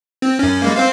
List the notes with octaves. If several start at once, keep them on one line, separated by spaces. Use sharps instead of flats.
C4
F#2 C#4
G3 G#3 A#3
C4 C5 F5